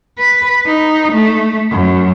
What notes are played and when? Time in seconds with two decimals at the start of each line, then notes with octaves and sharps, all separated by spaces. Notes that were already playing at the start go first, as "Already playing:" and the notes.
0.18 B4
0.66 D#4
1.12 A3
1.71 F#2